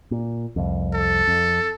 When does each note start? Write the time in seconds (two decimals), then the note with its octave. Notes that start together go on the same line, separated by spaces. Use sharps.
0.11 A#2
0.56 C2 F2
0.94 A4
1.28 F2